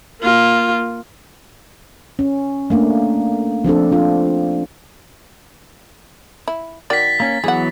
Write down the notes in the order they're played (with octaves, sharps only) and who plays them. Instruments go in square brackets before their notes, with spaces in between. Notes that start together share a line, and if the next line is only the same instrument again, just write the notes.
[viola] A#3 F4
[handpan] C#4
A3 A#3 D4
F3 C4 D4 A4
D4 F4
[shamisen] E4
[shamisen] D#3 F#4 D5 [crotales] A6 B6
[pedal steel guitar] A#3 C#4
[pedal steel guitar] E3 F#3 B3 [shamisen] G#4 F#5